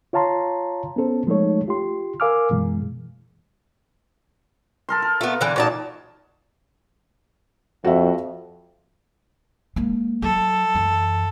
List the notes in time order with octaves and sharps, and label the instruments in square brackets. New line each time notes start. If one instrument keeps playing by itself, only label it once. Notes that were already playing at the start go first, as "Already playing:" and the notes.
[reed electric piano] F4 C#5 F5 A5 A#5 C6
B3 C#4 A4 C5
F3 G#3 A3 D#4 A4 C#5
F4 G4 C6
A#4 F5 G#5 D6 E6 F6
F#2 B2 E3 G#3
[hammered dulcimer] A4 A#4 C6
A#4
[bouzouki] A3 B3 [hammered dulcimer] F4
[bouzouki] D3 E3
[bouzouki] A#2 D5 A5 [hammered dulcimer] D#4 F#4 C#5
[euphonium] F2 [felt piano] F#4 E5
[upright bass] G#3 A#3
[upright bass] F#3 [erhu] A4
[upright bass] F#2 E3